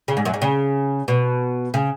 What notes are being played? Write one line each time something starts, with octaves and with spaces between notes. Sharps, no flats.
C#3
G#2
F#2
G#2
C#3
B2
C#3